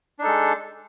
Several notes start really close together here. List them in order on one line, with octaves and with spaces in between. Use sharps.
D4 D#4 A4 G#3